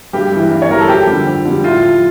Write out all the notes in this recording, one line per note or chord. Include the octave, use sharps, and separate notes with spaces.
G2 G4
E3 G3
G2
C#5
E3 G3 A#4
A4
F2 G4
D3 G3
F2
D3 G3
A2 F4
F3